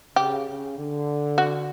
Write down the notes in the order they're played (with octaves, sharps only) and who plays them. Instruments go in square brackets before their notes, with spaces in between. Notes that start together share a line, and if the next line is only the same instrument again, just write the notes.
[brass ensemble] C#3 [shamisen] G4
[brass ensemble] C#3
D3
[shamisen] F#4